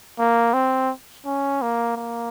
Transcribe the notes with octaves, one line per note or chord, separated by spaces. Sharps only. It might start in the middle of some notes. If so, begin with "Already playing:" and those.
A#3
C4
C#4
A#3
A#3